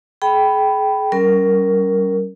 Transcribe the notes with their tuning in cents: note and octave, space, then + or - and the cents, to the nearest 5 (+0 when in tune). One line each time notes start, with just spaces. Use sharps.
G#4 +40 G5 -10 B5 +0
G3 -35 C#4 +10 A#4 +0